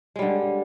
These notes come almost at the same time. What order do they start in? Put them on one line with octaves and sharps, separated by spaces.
G#3 G3 D3